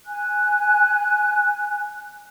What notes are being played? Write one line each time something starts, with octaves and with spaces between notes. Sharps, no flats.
G#5 F#6